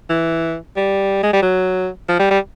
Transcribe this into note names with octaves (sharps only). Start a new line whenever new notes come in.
E3
G3
G#3
G3
F#3
F3
G3
G3